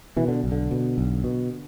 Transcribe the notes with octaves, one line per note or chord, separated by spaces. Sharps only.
B2 E3
D3
B1
D3
B2
B1
B2